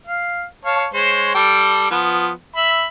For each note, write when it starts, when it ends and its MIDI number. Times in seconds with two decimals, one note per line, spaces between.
0.07 0.44 77
0.65 0.86 73
0.65 0.86 77
0.65 0.86 81
0.94 1.30 56
0.94 1.30 72
0.94 1.30 73
1.35 1.86 55
1.35 1.86 69
1.35 1.86 79
1.91 2.30 53
1.91 2.30 59
2.56 2.86 76
2.56 2.86 83